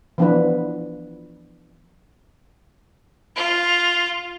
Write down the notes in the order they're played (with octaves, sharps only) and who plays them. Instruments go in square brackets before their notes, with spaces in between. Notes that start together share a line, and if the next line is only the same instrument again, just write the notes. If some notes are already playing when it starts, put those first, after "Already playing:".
[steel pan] E3 F3 B3 D4 F4 B4
[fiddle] F4